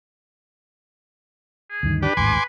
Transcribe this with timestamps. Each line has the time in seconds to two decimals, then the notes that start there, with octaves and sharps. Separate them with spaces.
1.70 G#4
1.83 D2 G2 D#3
2.02 D4 G4 B4
2.17 A1 D#2 G#2 G#5 C6 D6